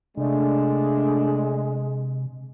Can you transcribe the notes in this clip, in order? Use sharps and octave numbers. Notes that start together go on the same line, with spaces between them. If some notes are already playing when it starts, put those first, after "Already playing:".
C3 G#3 A3 D4